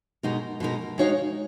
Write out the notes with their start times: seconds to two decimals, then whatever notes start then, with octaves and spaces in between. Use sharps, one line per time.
0.23 B2 G#3 D#4 A#4
0.60 B2 G#3 D#4 A#4
0.98 G#3 D#4 F#4 C#5 F5